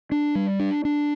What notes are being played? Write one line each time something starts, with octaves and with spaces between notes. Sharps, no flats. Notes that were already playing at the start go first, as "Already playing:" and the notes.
D4
G3
D4
D4